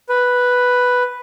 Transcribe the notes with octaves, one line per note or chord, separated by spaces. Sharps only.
B4